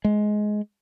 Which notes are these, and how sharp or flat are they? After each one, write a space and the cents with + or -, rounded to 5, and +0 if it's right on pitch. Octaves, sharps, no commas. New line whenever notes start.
G#3 +15